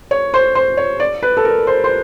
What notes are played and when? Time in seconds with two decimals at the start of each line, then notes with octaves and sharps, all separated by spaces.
0.11 C#5
0.34 C5
0.55 C5
0.77 C#5
1.00 D5
1.23 B4
1.37 A4
1.45 A#4
1.67 C5
1.84 C5